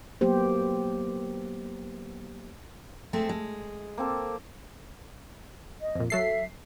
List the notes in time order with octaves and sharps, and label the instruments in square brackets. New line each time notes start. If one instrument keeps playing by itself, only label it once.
[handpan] F#3 A#3 B3 G4 C5
[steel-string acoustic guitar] G#3 A3 C4
G#3
[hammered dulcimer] A#3 C4 A4
[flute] D#5
[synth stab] F2 A#2
[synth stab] F#3 A4 C7 [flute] E5